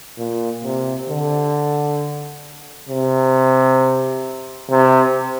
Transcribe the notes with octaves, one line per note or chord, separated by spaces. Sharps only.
A#2
C3
D3
C3
C3